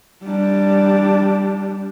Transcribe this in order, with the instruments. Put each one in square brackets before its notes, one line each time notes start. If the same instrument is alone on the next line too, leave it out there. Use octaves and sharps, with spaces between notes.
[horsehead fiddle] G3 D4